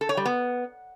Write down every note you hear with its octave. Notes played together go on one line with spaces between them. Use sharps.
A4
C#5
G3
B3